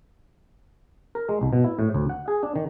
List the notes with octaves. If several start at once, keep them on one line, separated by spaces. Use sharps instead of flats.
A#4
G#3
C2
B2
E4
A2
D2
F#5
G#4
D4
D#3